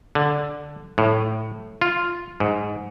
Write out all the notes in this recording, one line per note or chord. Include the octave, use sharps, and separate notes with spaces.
D3
A2
F4
G#2